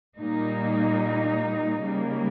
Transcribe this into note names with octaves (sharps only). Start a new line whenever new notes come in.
A#2 G3 A#3 D#4
C#3 G3 A#3